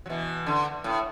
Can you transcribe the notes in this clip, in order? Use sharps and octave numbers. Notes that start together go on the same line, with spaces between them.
F#3
B2 E3
D3
A2